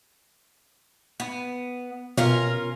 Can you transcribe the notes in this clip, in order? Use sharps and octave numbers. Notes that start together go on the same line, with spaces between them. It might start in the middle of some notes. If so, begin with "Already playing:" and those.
B3
B2 C#4 F4 A#4